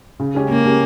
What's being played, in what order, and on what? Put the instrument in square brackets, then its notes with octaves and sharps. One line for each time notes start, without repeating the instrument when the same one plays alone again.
[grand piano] C#3
G#3 C#4 G4
[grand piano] C#3 [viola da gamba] A#3
[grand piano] G#3 C#4 G4